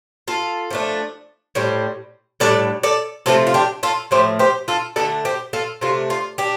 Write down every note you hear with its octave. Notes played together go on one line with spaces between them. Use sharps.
F4 A4
F3 A3 D4
A2 G3 C4
A2 G3 D4 A4 D5
A4 D5
C3 F3 A3 C4 F4 A4
F4
D4 G4
F4 A4
A2 F3 A3 G4 C5
G4 C5
F4 A4
D3 A3 D4 A4 D5
G4 C5
F4 A4
C3 A3 D4 F4
F4
D4 G4